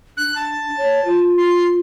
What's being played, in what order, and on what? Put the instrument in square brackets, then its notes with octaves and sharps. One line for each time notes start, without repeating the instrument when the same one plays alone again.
[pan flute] D4 [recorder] F#6
[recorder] A5
[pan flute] C#5
F4
[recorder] C6